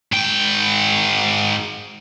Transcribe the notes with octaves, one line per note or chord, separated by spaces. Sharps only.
G#2 G5